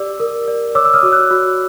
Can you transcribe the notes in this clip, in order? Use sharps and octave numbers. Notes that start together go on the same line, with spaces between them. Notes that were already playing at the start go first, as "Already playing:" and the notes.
Already playing: G4 D5 D6 E6
A#4
D5
C#5 D6 E6
E6
D#6 F6
F#4
E6 F#6
F#4